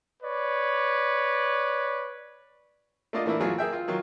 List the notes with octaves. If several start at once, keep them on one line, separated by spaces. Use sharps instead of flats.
B4 C#5 D5
A3 A#3 D4 F4 D5 D#5
E3 A3 A#3 D4 E4
E3 F#3 A3 F4 G#4
A#3 G#4 E5 G5
F4
D#3 F#3 F4